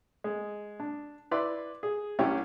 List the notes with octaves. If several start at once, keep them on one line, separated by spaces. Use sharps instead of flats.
G#3
D4
E4 B4 D5 E5 C6 D6
G#4
C2 G2 C#4 E4 G4